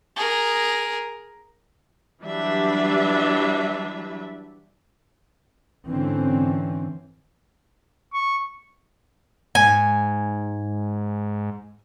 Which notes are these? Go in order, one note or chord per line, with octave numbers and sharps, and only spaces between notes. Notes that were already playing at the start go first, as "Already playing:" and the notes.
G#4 A#4
E3 F#3 G3 D4 B4 E5
G#2 D3 E3 C4 C#4
C#6
G#2 G#5